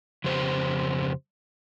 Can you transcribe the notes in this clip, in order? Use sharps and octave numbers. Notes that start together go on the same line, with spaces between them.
F2 C#3 G4 C5